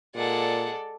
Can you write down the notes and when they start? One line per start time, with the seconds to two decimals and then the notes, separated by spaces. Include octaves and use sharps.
0.15 A#2 G#3 A4 D5 F#5